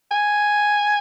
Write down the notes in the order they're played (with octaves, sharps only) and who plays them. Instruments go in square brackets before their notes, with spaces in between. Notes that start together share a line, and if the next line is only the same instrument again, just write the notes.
[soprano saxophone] G#5